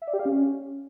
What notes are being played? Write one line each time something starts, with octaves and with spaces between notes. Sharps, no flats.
E5
D5
G4
F5
C#4